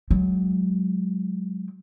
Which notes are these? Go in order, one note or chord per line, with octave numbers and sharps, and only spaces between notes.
F#3 G#3